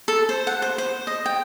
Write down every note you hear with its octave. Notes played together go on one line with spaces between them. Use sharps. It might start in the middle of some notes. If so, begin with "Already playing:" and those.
A4
C5
F#5
C5
C5
D#5
G5